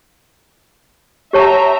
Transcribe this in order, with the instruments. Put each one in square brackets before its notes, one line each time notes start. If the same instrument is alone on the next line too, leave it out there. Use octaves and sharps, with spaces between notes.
[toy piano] G4 C#5 A5 [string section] E5 G5 A#5